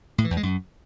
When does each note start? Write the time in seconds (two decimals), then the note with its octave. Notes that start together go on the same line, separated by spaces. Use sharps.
0.18 A2
0.24 E3
0.31 E2
0.37 G#3
0.43 F#2